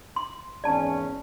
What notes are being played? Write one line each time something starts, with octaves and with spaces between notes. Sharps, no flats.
C6
G#1 E2 C#4 D5 A5